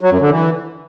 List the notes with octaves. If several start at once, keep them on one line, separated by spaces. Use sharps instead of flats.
F#3
F#2
D3
E3